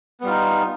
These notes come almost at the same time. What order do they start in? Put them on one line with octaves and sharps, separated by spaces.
B3 G3 F4 D#4